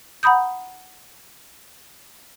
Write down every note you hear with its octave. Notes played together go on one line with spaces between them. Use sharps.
F#5 A#5 B5 D#6 G6